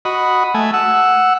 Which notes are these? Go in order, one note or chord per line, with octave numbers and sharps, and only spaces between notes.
F#4 D#5 B5
A3 G#5
F#5 E6